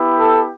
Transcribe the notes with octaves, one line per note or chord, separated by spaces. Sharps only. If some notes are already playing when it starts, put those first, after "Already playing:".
Already playing: B3 E4 G4
A4